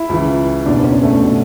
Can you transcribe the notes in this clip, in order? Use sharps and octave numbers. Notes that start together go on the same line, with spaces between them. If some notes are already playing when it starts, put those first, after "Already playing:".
Already playing: E4
C#2 C#3 E3
F#1 E2 B2 D4
C#4
A3
B2